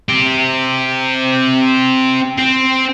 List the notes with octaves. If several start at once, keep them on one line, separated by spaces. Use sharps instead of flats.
C4 G4
C4